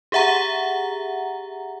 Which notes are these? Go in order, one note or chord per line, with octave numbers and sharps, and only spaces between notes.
G4 G#4 E5 F#5 A#5